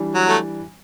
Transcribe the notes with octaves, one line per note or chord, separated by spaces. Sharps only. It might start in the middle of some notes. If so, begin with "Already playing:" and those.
Already playing: E3 G3 D4
F#3
A3